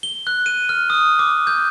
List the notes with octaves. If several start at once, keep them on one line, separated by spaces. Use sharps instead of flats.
G7
F#6
D#7
F6
D#6
D6
G6